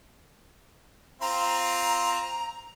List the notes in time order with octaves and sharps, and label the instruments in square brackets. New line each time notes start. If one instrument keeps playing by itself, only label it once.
[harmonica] C4 F4 [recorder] A#5